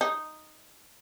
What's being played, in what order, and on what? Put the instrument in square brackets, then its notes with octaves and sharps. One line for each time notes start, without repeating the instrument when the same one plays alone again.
[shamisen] D#4